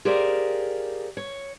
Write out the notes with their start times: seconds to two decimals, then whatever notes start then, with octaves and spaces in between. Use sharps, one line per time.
0.05 G4 G#4 A#4 C5 D5 F5
1.17 C#5